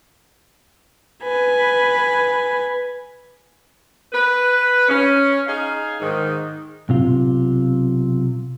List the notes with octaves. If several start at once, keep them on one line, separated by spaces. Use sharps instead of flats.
B4 G#5
B4
C#4
D#4 G#4 F5
G#2 D#3
B1 C3 F4